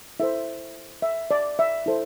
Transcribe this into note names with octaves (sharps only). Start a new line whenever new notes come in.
E4 A4 C5 E5
E5
D5
E5
E4 A4 C5